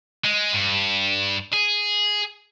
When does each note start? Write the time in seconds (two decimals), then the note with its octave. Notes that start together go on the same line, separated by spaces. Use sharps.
0.25 G#3
0.54 G2
1.53 G#4